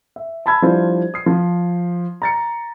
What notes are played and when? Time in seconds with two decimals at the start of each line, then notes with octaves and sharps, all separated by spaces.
0.16 E5
0.46 G#5 A5 B5 E6 G#6
0.62 F3 G3 D4 E4 F4 C5
1.14 D#6 C7
1.26 F3
2.22 A#5 A6 C#7